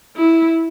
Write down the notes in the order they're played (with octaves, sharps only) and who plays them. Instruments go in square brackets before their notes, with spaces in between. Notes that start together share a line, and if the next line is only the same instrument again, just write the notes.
[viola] E4